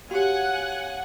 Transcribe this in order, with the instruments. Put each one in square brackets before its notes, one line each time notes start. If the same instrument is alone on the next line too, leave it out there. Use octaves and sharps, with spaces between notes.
[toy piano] F#4 G4 [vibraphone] C#5 F5 [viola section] F#5 G#5